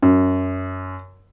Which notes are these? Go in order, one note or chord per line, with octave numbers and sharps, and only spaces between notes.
F#2